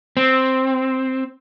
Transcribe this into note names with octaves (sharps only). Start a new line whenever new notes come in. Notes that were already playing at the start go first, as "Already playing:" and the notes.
C4